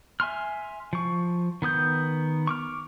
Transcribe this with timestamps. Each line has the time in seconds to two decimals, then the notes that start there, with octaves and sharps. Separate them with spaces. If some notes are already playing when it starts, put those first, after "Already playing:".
0.20 E5 G#5 C6 F6
0.93 F3 C#6
1.62 D#3 B3 D#6 G6
2.47 C#6 D6 F6